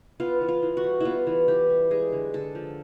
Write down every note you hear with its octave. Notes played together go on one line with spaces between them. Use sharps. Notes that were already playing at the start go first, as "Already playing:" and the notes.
B3 F4
E3
F4
E3
F#4
G3
B3 E4 F4
E3
E3 G4
G3
G#3 G#4
D3
D3 A4
F3